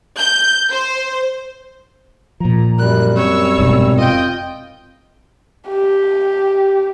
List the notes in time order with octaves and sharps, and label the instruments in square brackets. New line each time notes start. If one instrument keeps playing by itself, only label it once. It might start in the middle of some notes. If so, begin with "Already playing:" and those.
[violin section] G6
C5
[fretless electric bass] A#2 F3 [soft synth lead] A#5
[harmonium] F#2 G3 [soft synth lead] A#4 [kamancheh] F#6
[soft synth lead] C4 [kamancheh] C#5 E6
[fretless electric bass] F1 G#2 B2
[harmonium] F4 [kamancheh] D#5 G5
[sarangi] G4